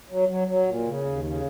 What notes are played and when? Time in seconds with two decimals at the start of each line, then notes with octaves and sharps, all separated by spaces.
0.10 F#3
0.29 F#3
0.48 F#3
0.67 A#2
0.86 C#3
1.05 D#2
1.24 C#3